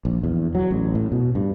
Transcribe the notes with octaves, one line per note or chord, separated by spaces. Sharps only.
A#1
E2
F#3
A1
A2
B2
G2